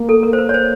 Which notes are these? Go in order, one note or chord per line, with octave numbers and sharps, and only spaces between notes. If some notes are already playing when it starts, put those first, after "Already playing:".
Already playing: A#3
A4
A#4
C5
B4
C#5
C5